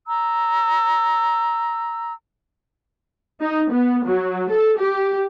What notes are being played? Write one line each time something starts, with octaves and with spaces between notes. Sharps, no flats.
A#5 E6
D#4
B3
F#3
A4
G4